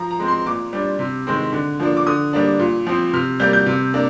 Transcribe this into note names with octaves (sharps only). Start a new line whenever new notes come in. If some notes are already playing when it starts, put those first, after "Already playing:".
Already playing: F3 A#5
A#5
G#3 C4
C6
A#2 D6
G3 D4
C3
D#3 G#3 C4
D3
F3 A#3 D4
D6
D3 D#6
G3 A#3 D4
A#2
F3 C4
C3 F6
G3 A#3 G6
G6
C3
A#3 D4